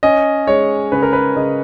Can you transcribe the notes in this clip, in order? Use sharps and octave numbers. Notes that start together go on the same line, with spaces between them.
C#4 D#5
G#3 C#5
C#3 B4
A#4
B4
C#3 D#5